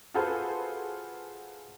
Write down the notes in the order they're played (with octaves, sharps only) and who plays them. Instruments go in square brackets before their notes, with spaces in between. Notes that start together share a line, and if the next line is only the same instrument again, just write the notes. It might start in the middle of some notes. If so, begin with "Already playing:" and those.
[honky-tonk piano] F4 F#4 G#4 A4 B4 C5